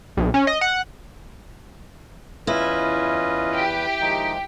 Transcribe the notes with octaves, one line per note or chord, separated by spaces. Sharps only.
B1
C#4
D#5
F#5
E2 C#4 E4 F4 B4 D#5
G4
D#3 F3 G#3 D#4